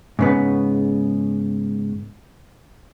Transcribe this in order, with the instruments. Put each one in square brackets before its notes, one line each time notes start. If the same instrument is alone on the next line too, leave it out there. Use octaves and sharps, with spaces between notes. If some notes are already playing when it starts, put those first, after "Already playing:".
[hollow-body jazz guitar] G#2 C#3 B3